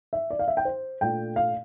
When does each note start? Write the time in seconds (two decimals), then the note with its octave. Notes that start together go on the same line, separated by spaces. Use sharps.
0.13 E5
0.30 D5
0.39 F5
0.48 E5
0.57 G5
0.65 C5
1.01 A#2 A3 D4 F4 G5
1.36 F5